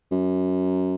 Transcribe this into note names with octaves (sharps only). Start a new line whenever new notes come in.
F#2